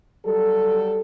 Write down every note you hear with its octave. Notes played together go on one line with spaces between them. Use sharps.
F#3 G3 A4